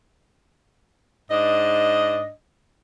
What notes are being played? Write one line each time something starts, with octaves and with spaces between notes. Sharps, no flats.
G#2 D4 D#5